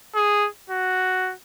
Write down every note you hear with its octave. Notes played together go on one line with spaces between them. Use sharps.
G#4
F#4